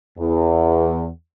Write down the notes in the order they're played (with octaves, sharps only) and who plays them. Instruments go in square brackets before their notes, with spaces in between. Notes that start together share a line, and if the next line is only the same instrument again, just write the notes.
[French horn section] E2